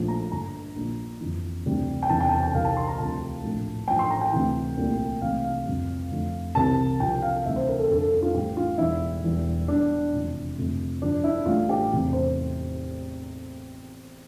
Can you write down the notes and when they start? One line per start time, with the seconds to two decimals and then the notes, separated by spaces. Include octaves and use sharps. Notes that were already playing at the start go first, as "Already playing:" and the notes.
Already playing: A#1 A#2 F3 A3
0.08 A#5
0.31 G1 G2 D3 A#5
0.75 A#1 A#2 F3
1.20 G1 F2 E3
1.65 D2 C3 E3 G3
2.03 G5
2.09 E2 C3 E3 A5
2.20 G5
2.31 A5
2.43 G5
2.54 C2 C3 E3 G3 F5
2.65 A5
2.77 C6
2.87 A#5
2.98 D2 C3 F3 A3 A5
3.43 A#1 A2 F3 A3
3.88 A1 G2 F3 G5
3.99 C6
4.10 A#5
4.21 G5
4.33 D2 C3 E3
4.77 C2 A#2 A3
5.22 C2 C3 E3 A3 F5
5.44 F5
5.66 G1 F2 C3 G3
6.11 F2 D3 F3 A3
6.55 C2 C3 E3 A5
7.00 C2 C3 F3 G5
7.22 F5
7.45 D2 C3 E3 G3 E5
7.56 C5
7.67 A#4
7.79 A4
7.89 G1 F2 D3 G3 A4
8.01 A4
8.12 A4
8.22 F4
8.34 A1 A2 G3 G4
8.57 F4
8.78 E1 E2 E3 G3 E4
9.23 E1 E2 E3 G3
9.68 E2 E3 G3 D4
10.13 F1 F2 C3 E3
10.58 G1 F2 C3 F3 A3
11.01 G1 G2 F3 D4
11.24 E4
11.46 A1 A2 G3 F4
11.69 G4
11.91 E2 C3 E3 A3
12.13 C5